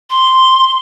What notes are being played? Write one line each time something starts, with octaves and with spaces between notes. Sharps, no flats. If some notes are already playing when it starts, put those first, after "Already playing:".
C6